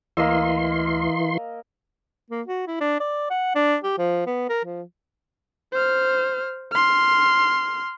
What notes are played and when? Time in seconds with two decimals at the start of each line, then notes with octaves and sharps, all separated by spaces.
0.17 D2 E3 A#3 D#5 C6 E6
2.30 A#3
2.47 F#4
2.67 E4
2.81 D4
3.00 D5
3.30 F#5
3.55 D4
3.84 G4
3.98 F3
4.27 B3
4.49 A#4
4.65 F3
5.72 C5 F6
6.72 C6 F6